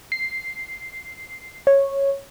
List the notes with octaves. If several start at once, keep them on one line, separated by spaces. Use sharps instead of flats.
C7
C#5